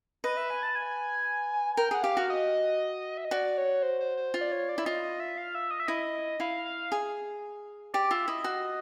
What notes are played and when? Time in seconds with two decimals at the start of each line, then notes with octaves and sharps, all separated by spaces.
0.24 B4 D#5
0.37 E5
0.50 G#5
0.63 A5
0.75 G#5
1.77 A#4 G5
1.91 G#4 F#5
2.03 G4 F5
2.17 F#4
2.30 D#5
3.17 E5
3.25 D#5
3.31 F#4 D5
3.58 C#5
3.83 C5
4.00 C5
4.17 C5
4.34 F4
4.41 D5
4.52 C#5
4.69 D5
4.78 E4
4.85 F4 D#5
5.03 D#5
5.20 E5
5.38 F5
5.55 E5
5.71 D#5
5.80 E5
5.88 E4 D#5
6.40 E4 F5
6.66 F5
6.92 G#4
7.94 G4 D5
8.11 F4 E5
8.28 E4 D#5
8.44 F#4